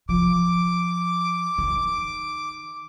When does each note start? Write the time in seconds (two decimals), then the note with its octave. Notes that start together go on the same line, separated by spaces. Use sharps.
0.09 F3 D6
1.58 D#3